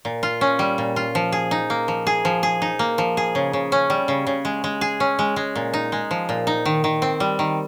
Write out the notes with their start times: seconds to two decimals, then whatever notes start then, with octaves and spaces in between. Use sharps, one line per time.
0.05 A#2
0.23 F4
0.41 C#4
0.59 G3
0.78 A#2
0.96 F4
1.15 F3
1.32 G#4
1.51 D#4
1.70 A#3
1.88 F3
2.07 G#4
2.25 F3
2.43 G#4
2.62 D#4
2.79 A#3
2.98 F3
3.17 G#4
3.35 C#3
3.53 C#3
3.72 C#4
3.90 G3
4.08 C#3
4.27 C#3
4.45 G#3
4.64 G#3
4.81 G#4
5.00 C#4
5.19 G#3
5.36 G#3
5.56 A#2
5.74 D#4
5.92 G#3
6.11 F3
6.29 A#2
6.47 D#4
6.65 D#3
6.84 D#3
7.02 C4
7.20 G3
7.39 D#3